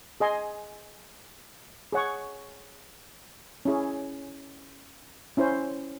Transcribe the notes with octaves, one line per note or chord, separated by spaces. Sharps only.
G#4 D#5 G#5 C6
G#4 C#5 F#5 C#6
C#4 E4 G#4
C#4 E4 C5